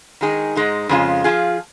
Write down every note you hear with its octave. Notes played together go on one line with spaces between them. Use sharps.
D#3 G#3 D#4 G#4
G#2 G#3 D#4
F2 C#3 G#3 C#4 F4
F3 G#3 F4 G#4